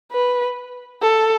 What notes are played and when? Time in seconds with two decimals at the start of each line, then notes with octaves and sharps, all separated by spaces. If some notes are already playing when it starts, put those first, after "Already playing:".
0.12 B4
1.02 A4